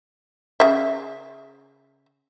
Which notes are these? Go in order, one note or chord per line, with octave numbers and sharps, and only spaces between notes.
C#3 E5